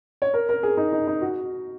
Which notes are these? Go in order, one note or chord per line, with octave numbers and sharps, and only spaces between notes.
C#5
A#4
A#4
G#4
D#4
D#4
D#4
F#4